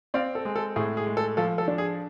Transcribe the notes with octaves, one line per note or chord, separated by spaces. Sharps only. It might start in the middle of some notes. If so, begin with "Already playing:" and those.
C4 D5 F5
A4
G#3
A4
A2 G#4
G#4
G#3
A4
F3 A4
A4
D4
G#4